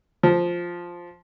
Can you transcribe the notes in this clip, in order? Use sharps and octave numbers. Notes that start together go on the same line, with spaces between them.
F3